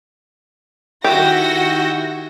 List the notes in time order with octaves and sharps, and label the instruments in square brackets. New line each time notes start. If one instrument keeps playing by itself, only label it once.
[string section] D#3 F#4 A#6 [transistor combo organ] E4 G5 [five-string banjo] G4